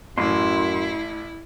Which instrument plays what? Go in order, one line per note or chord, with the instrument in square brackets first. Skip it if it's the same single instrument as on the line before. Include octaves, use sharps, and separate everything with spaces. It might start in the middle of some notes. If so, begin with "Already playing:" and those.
[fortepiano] A1 [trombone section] F#2 [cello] E4 [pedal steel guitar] C6